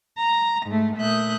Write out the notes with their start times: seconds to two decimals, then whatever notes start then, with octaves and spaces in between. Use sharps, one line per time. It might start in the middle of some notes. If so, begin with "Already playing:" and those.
0.18 A#5
0.67 G#2 A3
0.98 A#2 A3 E5 D#6 F#6 G6